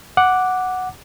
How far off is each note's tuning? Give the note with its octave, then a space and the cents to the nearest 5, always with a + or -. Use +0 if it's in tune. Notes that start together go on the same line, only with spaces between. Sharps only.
F#5 +0 D6 +0